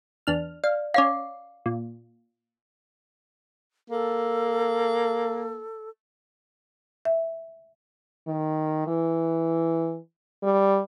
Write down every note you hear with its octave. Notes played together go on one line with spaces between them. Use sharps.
E2 D4 F6
D5 F5
C#4 C#5 F5 D6 C7
A#2
A#3 A4
E5
D#3
E3
G3